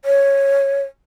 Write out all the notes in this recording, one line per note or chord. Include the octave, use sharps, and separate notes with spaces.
C#5